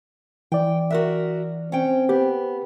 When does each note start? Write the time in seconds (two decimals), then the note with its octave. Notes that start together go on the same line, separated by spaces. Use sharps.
0.52 E3 D5 G5
0.91 F#4 A#4 E5
1.72 C4 C#4 G5
2.09 B3 G4